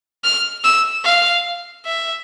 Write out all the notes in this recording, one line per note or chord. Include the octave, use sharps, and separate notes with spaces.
F6
E6
F5
E5